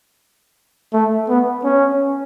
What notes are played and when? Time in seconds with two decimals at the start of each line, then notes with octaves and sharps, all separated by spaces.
0.93 A3
1.29 B3
1.64 C#4